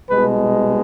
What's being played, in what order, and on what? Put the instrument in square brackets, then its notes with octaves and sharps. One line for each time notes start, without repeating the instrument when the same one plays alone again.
[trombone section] C2 B2 G#3 B4